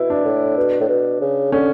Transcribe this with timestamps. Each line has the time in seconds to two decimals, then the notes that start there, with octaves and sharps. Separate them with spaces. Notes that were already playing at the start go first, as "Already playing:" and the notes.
Already playing: B2 E4
0.10 D4
0.25 A2
0.57 B2
0.80 A2
0.88 B2
1.21 C#3
1.52 D3 C#4